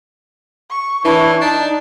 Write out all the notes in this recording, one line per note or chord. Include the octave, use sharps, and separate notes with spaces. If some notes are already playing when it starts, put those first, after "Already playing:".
C#6
E3 D4 E4 C#5
D4 D#4 A5